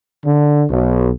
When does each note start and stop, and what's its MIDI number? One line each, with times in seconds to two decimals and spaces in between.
0.25 0.64 50
0.69 1.08 35